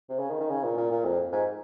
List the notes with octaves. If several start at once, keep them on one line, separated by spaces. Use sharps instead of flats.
C3
C#3
D#3
D#3
C#3
A#2
A#2
A#2
F2
G#2